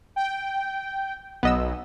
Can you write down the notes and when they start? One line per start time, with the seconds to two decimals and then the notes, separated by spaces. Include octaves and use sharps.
0.16 G5
1.43 B1 B3 D#5 E6